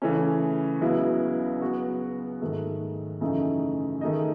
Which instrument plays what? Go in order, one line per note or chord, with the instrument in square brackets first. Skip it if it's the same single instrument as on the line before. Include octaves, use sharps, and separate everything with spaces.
[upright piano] C#3 E3 A3 C#4
C#2 C#3 F#3 B3 E4
F#3 B3 F#4
G#2 D#3 A3
F#2 C#3 E3 A3 D#4
D#3 A3 D#4 G#4 D#5